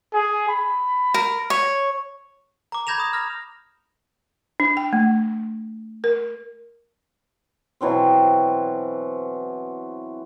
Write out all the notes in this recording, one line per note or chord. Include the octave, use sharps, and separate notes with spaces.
G#4
B5
A#4
C#5
A#5 D6
B5 G6 G#6 A#6 E7 F7
D#6
F6 A#6
D4
G5
A3
A#4
B2 E3 F#3 C4